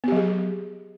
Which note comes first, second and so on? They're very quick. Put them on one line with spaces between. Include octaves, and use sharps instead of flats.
B3 G4 F#3 G#4